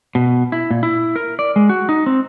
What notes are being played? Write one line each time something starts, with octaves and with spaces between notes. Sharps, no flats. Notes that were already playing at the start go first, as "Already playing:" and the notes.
B2
E4
A#2
E4
A#4
D5
G#3
F#4
D#4
C4